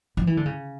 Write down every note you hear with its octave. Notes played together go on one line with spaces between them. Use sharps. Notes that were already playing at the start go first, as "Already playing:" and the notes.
F3
E3
D3
C#3